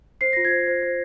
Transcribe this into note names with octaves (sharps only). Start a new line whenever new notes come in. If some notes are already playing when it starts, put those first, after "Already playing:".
C5 C7
F4 A#6
G#6
C5
C5
C5